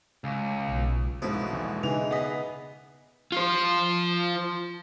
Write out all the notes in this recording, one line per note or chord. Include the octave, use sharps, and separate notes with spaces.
C#2
B1
A1 G#2 B2 F3 E4
A#1 E2
C#3 E3 D#4 G#4 F7
B3 G#4 D#5 B6
F4 C5